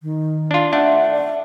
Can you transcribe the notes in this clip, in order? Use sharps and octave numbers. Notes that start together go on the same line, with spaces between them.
D#3
D4 F4
A3 D4 F#5
D5